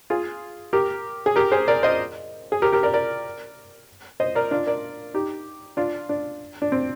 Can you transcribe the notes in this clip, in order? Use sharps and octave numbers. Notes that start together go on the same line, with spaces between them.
F4 G#4
G4 A#4
G#4
G4 A#4
G#4 C5
A#4 D5
C5 D#5
G#4
G4 A#4
G4 A#4
A#4 D5
A#4 D5
C5 D#5
A#4 D5
D4 F4
A#4 D5
D#4 G4
D4 F4
D4
D4
C4